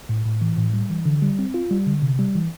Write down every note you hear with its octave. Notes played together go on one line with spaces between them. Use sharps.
A2
A2
E3
A2
G3
E3
D3
G3
C4
F4
G3
D3
C3
G3
E3